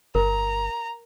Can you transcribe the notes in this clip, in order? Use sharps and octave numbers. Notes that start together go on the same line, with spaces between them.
G1 A#4 A#5